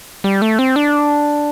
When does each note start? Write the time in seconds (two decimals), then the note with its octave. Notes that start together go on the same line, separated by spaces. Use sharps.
0.24 G3
0.42 A3
0.59 C4
0.76 D4